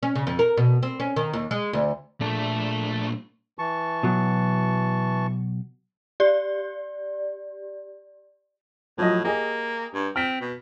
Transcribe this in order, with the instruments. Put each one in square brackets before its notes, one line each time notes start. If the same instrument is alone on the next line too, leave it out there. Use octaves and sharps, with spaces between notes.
[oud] C#4
C#3
F2
A#4
B2
C4
C#4
D#3
D#2
G#3
D2
[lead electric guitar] A#2 D4 [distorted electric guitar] A3 A4
[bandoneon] E3 A5 C#6
[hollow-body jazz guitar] B2 F#3
[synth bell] G4 D5
[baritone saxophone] A2 [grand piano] F3 F#3 D#5
[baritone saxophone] A#3 [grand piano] G4 G#4 D#5
[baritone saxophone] G2
[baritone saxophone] C4 [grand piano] F6 B6
[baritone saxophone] B2